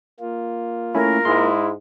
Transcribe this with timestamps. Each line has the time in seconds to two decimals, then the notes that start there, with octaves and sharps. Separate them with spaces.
0.20 A#3 F4
0.95 A3 C#4 E4 A#4
1.25 G#2 G#3 E4 C6